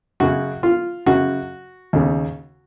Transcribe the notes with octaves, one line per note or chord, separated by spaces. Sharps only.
F#2 C#3 F#4
F4
F#2 C#3 F#4
D#2 C#3